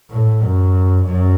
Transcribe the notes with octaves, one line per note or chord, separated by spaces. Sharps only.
A2
F#2
F#2